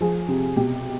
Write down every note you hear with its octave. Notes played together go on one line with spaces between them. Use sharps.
F3 G#4
C3
B2 G4